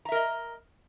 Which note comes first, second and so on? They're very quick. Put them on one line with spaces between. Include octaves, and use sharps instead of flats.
A#5 E5 A#4 D#5